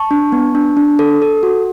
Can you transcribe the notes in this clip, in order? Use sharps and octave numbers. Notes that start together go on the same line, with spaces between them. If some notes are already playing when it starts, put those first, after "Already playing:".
Already playing: A5 C#6
D4
B3
D4
D4
A4
A4
F#4